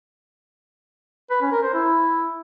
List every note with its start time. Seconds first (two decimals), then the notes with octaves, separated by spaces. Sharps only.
1.30 B4
1.41 C#4
1.52 A#4
1.63 C5
1.74 E4